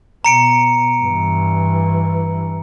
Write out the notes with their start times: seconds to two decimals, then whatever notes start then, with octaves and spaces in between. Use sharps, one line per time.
0.25 B2 A#5 C#7 D7
1.01 G2 E3